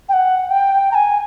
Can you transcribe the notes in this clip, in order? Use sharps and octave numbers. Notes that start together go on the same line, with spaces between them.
G5
F#5
G5
A#5
G#5